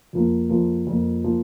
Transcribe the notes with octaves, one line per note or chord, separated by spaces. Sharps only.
F2 F3 A#3
F2 F3 A#3
F2 F3 A#3
F3 A#3